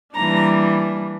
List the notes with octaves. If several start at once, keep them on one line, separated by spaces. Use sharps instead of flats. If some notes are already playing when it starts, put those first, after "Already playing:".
E3 G3 A#3 D4 A#5